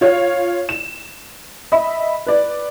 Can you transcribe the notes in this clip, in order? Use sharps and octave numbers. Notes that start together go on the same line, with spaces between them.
F4 C#5 F5
E7
D#5 E5 B5
B4 D5